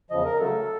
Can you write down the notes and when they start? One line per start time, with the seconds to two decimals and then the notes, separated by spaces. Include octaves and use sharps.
0.10 E2 C#3 F3 D#5
0.25 A#4
0.39 C#3 F#3 A3 A4